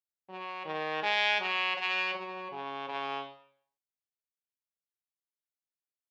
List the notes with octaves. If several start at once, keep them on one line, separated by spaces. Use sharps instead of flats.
F#3
D#3
G#3
F#3
F#3
F#3
C#3
C#3